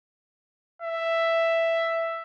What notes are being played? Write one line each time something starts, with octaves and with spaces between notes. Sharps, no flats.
E5